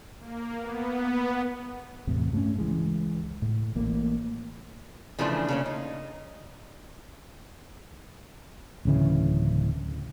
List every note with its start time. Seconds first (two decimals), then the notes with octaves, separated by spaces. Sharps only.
0.19 A#3
0.58 B3
2.07 E2 A2 C3
2.33 G2 A3 B3 C#4
2.58 C#2 E3 G#3
3.42 A2
3.75 A1 A2 A#3
5.19 C#3 E3 F3 A3 D4
5.49 C#3 A#3 C#4
5.66 D#4
8.85 D1 C#3 E3